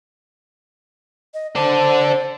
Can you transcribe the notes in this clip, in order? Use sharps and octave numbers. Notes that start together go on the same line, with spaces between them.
D#5
D4 A4 C5